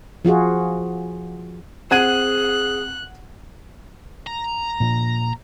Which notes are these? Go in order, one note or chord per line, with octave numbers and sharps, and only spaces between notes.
F3 F4 F#4 G#4
C4 G#4 F#5 F#6 G#6 D#7
A#5
A#2 F3